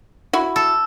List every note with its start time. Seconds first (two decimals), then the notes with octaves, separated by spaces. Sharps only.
0.33 E4 F#4
0.56 A4